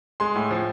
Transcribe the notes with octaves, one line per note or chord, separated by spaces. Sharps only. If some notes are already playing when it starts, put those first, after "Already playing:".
G#3 C6
A2
F3